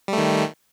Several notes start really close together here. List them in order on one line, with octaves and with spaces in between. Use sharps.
G3 A3 D#3